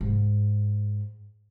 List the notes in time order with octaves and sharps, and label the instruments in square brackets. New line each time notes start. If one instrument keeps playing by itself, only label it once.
[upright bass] G#2